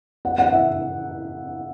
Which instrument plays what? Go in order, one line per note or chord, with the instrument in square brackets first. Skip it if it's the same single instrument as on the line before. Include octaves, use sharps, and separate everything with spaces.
[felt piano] F#5
F#5
E5